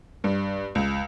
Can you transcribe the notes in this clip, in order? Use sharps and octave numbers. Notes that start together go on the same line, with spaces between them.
G2
C#2